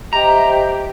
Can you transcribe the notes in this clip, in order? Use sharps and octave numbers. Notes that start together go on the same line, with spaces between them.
G4 C5 D#5 E5 A#5